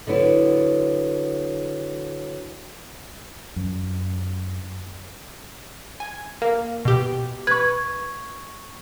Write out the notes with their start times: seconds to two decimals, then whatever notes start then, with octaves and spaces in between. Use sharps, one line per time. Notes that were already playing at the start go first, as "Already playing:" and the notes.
0.07 D3 F#3 B3 E4
3.56 F#2
6.00 G#5
6.42 A#3
6.85 B2 G4
7.47 B4 C#6 G#6